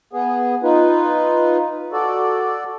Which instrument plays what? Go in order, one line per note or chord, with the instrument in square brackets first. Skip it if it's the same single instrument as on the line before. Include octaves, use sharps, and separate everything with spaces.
[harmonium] B3 G#4
D#4 F4 B4
F#4 A4 D5